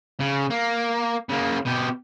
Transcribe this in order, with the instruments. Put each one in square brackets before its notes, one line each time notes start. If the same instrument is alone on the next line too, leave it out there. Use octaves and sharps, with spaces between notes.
[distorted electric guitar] C#3
A#3
C#3 A#3
B2 G4